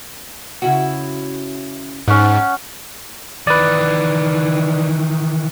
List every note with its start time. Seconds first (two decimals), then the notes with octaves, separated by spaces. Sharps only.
0.62 C#3 E4 F#4
2.08 G#2 C#4 F#5
3.47 D#3 E3 B4 D5